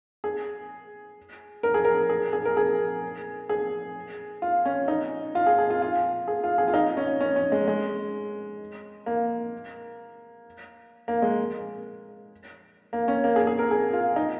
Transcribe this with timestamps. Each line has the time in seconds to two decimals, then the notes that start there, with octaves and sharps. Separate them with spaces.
0.24 G#4
1.63 A#4
1.74 G#4
1.85 A#4
2.09 G#4
2.33 G#4
2.45 A#4
2.57 G#4
3.49 G#4
4.42 F4
4.65 C#4
4.88 D#4
5.35 F4
5.46 G#4
5.58 G#4
5.70 F4
5.82 F4
6.28 G#4
6.44 F4
6.58 G#4
6.68 F4
6.74 D#4
6.97 C#4
7.20 C#4
7.36 C#4
7.52 G#3
7.68 G#3
9.06 A#3
11.08 A#3
11.22 G#3
12.93 A#3
13.08 C#4
13.24 A#3
13.36 G#4
13.47 G#4
13.59 A#4
13.71 G#4
13.93 F4
14.16 D#4